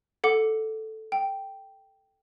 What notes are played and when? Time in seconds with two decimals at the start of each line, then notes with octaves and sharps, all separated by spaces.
0.24 A4 F#5 D6
1.12 G5